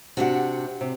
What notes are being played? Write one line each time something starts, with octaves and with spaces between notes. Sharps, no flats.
C3 D4 F#4 G4 D5 F#5
C3